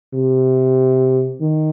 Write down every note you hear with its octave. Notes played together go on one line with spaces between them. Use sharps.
C3
D#3